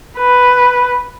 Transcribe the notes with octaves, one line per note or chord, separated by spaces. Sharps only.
B4